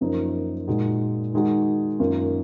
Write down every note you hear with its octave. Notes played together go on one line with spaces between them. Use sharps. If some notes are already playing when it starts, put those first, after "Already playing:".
F#2 F3 A#3 D#4
A#2 G#3 D#4 F#4
D#3 G#3 D#4 F#4
F#2 D#3 A#3 F4